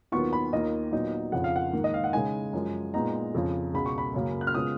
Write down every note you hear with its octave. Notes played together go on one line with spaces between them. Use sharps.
D#2 D#3 F#3 B3 F4 C#6
B5
D#2 D#3 A#3 F4 D#5
A#2 F#3 B3 D#4
F2 C#3 F3 F#5
F5
F#5
G#2 D#3 A#3
D#5
F5
F#5
C#3 G#3 D#4 G#5
F#2 F3 G#3
A#2 G#3 B3 D#4 A#5
F2 C#3 F3
C#2 B2 G#3 B5
C#6
B5
F#2 C#3 F#3 A#3
F#6
F6
C#3 G#3 B3 F4 D#6